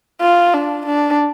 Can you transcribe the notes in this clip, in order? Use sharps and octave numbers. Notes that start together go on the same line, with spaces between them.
F4
D4
D4